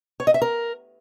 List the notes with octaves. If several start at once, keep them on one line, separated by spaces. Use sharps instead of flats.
C#5
D#5
E5
A#4